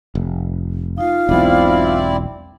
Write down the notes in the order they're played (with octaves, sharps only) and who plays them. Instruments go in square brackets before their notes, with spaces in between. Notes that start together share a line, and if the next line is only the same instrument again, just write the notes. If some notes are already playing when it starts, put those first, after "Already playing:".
[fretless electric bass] F1
[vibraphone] D#4 F4 [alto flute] F5
[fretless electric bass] E1 B1 [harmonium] C4 E4 D5